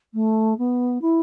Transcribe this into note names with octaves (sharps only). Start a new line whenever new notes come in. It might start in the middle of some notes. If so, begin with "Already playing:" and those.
A3
B3
E4